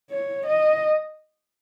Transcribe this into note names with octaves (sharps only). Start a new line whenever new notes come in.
C#5
D#5